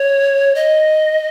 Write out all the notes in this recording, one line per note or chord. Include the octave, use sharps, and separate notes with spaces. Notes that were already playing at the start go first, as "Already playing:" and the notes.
Already playing: C#5
D#5